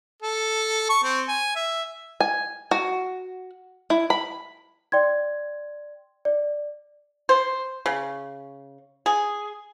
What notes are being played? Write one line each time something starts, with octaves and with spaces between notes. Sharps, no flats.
A4
C#6
C4
G#5
E5
G#5
F#4
E4
B5
D5 G5 C6 G#6
D5
C5
C#3
G#4